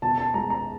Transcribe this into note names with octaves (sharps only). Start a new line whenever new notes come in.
B2 A5
A5
G#3 A#5
A#5